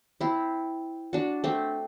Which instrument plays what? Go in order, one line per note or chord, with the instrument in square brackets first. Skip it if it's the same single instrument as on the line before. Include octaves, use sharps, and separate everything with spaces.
[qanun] C4 E4
D4 F#4
A3 C4